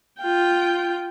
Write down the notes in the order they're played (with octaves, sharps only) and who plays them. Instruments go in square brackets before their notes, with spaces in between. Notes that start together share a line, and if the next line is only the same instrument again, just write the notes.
[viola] F4 G5